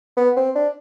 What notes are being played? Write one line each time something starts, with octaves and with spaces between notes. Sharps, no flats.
B3
C4
D4